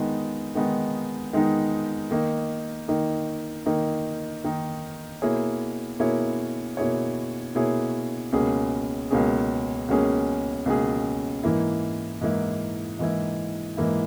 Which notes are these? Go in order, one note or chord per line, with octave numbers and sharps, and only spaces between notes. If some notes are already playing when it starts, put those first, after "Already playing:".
Already playing: D#3 G#3 B3 D#4
D#3 G#3 B3 D#4
D#3 G#3 B3 D#4
D#3 A#3 D#4
D#3 A#3 D#4
D#3 A#3 D#4
D#3 A#3 D#4
B2 A#3 E4 G#4 C#5
B2 A#3 E4 G#4 C#5
B2 A#3 E4 G#4 C#5
B2 A#3 E4 G#4 C#5
C#2 B2 A#3 C#4 G#4
C#2 B2 A#3 C#4 G#4
C#2 B2 A#3 C#4 G#4
C#2 B2 A#3 C#4 G#4
G#2 E3 A#3 E4
G#2 E3 A#3 E4
G#2 E3 A#3 E4
G#2 E3 A#3 E4